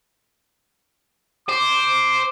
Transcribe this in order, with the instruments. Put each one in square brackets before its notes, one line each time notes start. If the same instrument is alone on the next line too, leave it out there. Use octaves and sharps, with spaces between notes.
[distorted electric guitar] C5 [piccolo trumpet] D6